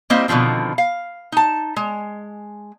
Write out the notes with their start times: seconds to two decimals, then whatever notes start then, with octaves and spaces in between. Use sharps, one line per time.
0.10 G3 A#3 C4 E4 C5 D#5
0.28 B2 D3 D#3 F3 C4
0.78 F5
1.32 D#4 A5
1.76 G#3